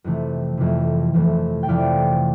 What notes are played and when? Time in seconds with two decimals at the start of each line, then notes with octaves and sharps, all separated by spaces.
0.04 F2 C3 E3 A3
0.57 F2 C3 E3 A3
1.14 F2 C3 E3 A3
1.63 G5
1.68 F2 C3 E3 A3 D5 F5